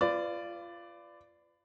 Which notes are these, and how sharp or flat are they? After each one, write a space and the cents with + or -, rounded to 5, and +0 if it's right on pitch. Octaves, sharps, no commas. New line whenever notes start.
F4 -20 B4 +30 D5 +0